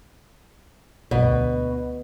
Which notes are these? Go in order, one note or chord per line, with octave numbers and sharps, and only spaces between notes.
B1 G2 B2
D2